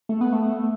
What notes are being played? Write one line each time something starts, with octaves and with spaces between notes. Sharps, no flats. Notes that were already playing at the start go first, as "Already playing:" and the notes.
A3
B3
A3